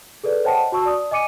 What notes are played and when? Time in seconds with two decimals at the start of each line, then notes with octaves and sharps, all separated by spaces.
0.24 G#4 A4 B4 D5
0.44 C5 C#5 D#5 F#5 G5 A5
0.72 F#4 A5 C#6 E6
0.86 D5 D#6
1.11 D#5 G#5 D6 C#7 D#7